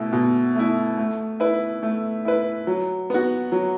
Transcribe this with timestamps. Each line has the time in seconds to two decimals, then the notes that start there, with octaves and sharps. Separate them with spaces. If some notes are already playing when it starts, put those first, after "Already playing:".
Already playing: B2 A3 E4
0.13 B2
0.56 A3 E4
0.98 A3
1.40 E4 B4
1.83 A3
2.25 E4 B4
2.67 F#3
3.10 B3 F#4
3.52 F#3